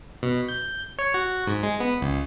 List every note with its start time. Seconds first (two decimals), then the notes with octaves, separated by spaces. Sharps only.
0.23 B2
0.48 G6
0.99 C#5
1.14 F#4
1.47 G#2
1.63 G#3
1.80 B3
2.01 C#2